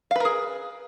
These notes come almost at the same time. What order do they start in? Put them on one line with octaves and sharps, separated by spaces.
F5 B4 A#4 G#4